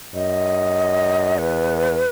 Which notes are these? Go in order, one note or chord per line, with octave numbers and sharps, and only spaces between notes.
F#2 D#5
E2 B4